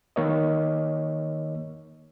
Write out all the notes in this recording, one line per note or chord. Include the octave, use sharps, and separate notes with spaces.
D#3 A#3 C#5 D#5